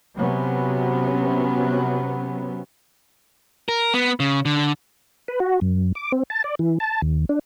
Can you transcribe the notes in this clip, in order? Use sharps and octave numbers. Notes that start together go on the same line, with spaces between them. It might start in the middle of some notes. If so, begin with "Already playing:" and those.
C3 F#3 B3 C#4
A#4
B3
C#3
D3
B4
F#4
F#2
D6
C4
A5
D5
E3
A5
D#2
D4